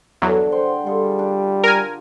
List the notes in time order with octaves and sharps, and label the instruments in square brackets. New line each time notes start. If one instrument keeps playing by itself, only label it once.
[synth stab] E2 F#3 [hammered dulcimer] G2 D3 A4
[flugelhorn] C5 [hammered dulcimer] F#5 G5 C6
[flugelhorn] G3 [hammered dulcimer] F4 G#4 A4
[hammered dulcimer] D4 G4 D6
[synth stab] A#4 G#5